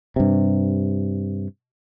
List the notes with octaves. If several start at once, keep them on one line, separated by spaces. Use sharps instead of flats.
G2 C3